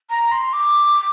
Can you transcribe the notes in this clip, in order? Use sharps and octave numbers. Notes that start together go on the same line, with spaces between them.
A#5
C6
D6